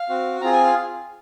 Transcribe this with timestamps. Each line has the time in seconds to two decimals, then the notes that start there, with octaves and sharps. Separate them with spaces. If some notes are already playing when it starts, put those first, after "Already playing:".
Already playing: F5
0.09 C4 F#4
0.41 C4 F4 G#4 A#5
0.52 G#5
0.63 F5